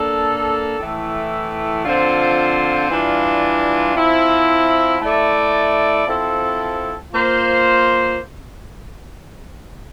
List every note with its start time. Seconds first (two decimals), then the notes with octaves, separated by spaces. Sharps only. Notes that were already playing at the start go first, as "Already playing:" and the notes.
Already playing: A#3 D4 A4
0.80 A2 E3 A3
1.85 D3 F3 C4 F4 C5
2.91 E3 G3 D4 F4
3.96 F3 C4 E4
5.02 A3 E4 A4 D5
6.07 F3 C4 E4 A4
7.13 A#3 F4 C5